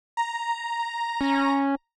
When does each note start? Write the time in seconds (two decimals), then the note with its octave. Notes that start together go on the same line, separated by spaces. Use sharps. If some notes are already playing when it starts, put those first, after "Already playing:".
0.17 A#5
1.21 C#4